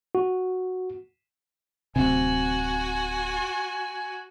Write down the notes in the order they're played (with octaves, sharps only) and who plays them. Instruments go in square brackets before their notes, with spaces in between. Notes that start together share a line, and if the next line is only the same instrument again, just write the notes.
[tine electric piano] F#4
[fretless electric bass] D1 C3 [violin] F#4 [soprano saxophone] G#5